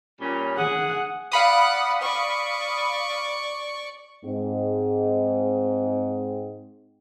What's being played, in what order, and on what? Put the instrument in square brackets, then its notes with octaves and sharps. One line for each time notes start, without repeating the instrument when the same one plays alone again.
[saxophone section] A#2 G3 C#4
[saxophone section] G#4 [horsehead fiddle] F#5
[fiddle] D5 F#5 [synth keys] F5 B5 D#6
[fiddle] D5 C#6
[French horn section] G#2 C4